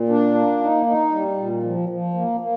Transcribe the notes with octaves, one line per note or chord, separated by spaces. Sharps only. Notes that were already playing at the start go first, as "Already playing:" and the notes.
Already playing: A#2
D4
A#3
D#4
D#4
G3
A#2
F3
F3
A#3
A#3